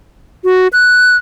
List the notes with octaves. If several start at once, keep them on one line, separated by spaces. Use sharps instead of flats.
F#4
F#6